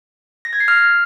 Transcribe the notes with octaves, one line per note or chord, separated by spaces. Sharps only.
A#6
G#6
C7
F6